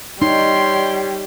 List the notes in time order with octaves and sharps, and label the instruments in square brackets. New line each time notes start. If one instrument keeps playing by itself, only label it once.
[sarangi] G3 [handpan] D#4 [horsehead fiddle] C#5 G5 [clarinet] C6